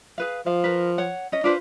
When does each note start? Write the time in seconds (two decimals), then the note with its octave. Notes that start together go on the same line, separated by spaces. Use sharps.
0.18 G#4 B4 F5
0.46 F3 F5
0.64 A#4 B4
0.98 C#5 F#5
1.32 C#4 D#5
1.44 D4 F4 B4 C5